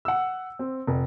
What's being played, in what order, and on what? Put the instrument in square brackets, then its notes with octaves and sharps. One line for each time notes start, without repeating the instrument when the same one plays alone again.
[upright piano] F#5 E6
C4
F1